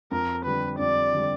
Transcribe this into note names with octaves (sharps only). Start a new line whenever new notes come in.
F2 A#4
D3 G3 B4
F2 D5
D3 G3